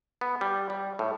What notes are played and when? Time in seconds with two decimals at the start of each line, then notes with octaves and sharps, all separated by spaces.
0.21 B3
0.41 G3
0.70 G3
0.99 A2